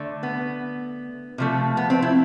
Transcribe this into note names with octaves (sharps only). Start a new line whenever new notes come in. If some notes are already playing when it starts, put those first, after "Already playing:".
Already playing: D3 A3
B3
C3 F3 A3
B3
C4
E4